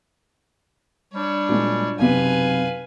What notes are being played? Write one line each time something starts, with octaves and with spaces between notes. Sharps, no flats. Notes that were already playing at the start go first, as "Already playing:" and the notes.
G3 D4 C#5
A#2 F#3 G#3
B1 F#2 C3 B4 F5 G#5